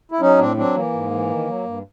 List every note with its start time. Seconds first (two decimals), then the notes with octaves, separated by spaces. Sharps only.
0.12 E4
0.21 F#3 C#4 D#4
0.39 A2 C4 D4
0.57 F#3 C4 D4
0.75 E3 A#3
0.93 G#2
1.11 E3
1.29 D#3
1.47 F#3
1.65 G2